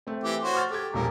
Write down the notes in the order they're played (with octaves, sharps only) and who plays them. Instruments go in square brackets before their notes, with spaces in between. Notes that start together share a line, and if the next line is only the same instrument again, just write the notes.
[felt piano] A3 C4
[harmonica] E3 G4
F#4 C5 C#5
[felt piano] C#6 F6 A6
[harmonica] G4 [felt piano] A4 G#6
[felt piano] E1 A#1 [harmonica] G3 A#4